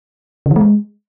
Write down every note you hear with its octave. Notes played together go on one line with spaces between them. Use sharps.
C#3
E3
A3
G#3